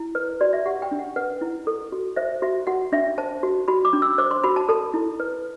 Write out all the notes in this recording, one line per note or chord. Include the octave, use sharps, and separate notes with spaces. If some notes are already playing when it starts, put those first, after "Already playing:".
Already playing: E4
B4
F#4 D5
E5
G4 F#5
G5
D4
F#5
B4 F#5
E4
A4
F#4
C5 E5
F#4 E5
F#4 F#5
D4 E5
C5 A5
F#4
F#4 B5
D6
D4
E6
C5 D6
C6
F#4 B5
A5
A4 A5
E4
B4